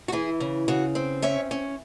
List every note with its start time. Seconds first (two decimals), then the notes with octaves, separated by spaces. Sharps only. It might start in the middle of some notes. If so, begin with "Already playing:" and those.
0.08 F#4
0.12 E3 E4 G#4
0.40 C#3
0.68 C#3 F#4
0.95 C4
1.22 C#4 C#5 E5
1.51 C#4